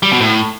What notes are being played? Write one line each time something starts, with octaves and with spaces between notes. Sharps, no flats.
G3
B2
A2